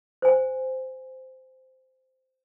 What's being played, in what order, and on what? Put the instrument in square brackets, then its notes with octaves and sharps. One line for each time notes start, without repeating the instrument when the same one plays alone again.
[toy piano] C5 G#5